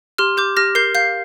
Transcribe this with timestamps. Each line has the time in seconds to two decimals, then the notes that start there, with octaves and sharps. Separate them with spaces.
0.18 G4 C6 F6
0.37 G4 D6 G6
0.57 G4 F6 A#6
0.75 A#4 G6 C7
0.95 F5 G6 C7